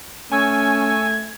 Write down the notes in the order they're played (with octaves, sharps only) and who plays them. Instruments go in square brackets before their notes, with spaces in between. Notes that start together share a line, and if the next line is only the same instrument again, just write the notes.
[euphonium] A3 [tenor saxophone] C#4 [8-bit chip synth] G#5 C#6 E6 [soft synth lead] G#6